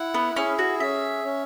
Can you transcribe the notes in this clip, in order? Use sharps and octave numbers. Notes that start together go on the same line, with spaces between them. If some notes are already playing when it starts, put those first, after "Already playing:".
Already playing: E4 F#5
B3
C#4 G#4
F#4
C#4 E5
C#4